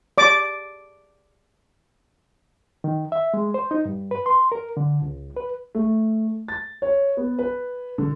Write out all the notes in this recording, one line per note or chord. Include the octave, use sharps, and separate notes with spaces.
D5 D6
D#3
E5
G#3
C5
D#4
G2
B4
C6
A#4
D3
C#2
B4
A3
A6
C#5
B3
B4
D3